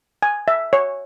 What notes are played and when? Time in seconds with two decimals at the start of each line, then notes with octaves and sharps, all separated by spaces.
0.22 G#5
0.48 E5
0.73 C#5